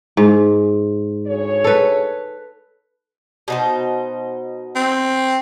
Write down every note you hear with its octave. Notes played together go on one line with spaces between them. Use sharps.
G#2
D2 G#4 C#5
A4 B4
B2 D#4 C5
C4